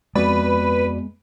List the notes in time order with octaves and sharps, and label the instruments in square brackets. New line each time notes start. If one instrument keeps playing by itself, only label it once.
[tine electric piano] F2 F#4 D5 [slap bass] G#3 B3 [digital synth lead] B4